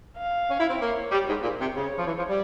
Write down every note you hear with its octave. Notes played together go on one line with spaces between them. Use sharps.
F5
C#4
E4
C4
A#3 C#5
G3
G#2
A#2 C5
C3
C#3 C#5
F3
E3
F3
G3